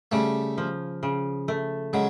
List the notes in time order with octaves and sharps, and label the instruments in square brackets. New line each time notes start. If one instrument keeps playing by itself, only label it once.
[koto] C#3 [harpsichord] G3 A3
[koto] F3
C#3
A3
[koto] C#3 [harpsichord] F#3 G#3